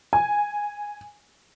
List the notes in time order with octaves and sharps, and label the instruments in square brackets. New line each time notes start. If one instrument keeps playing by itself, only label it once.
[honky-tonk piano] G#5